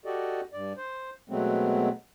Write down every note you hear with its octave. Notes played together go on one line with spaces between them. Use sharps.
F#4 G4 A4 D5 D#5
G2 D5
C5
B2 F#3 G#3 A3 B3 C4